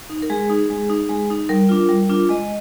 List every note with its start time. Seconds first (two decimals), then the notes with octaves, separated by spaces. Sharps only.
0.10 D#4
0.22 A#4
0.30 G#3 G#4
0.50 D#4
0.70 G#3
0.90 D#4
1.09 G#3
1.30 D#4
1.49 G3 A#4
1.69 D4 F4
1.89 G3
2.09 D4 F4
2.29 G#3 D#5